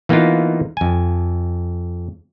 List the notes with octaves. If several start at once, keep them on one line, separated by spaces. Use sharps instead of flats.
E3 A#3 B3 D#4 F4
F2 G#5